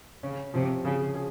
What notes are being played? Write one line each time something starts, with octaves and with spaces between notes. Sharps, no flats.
C#3 C#4
C3 F3
C#3 G#4
G#4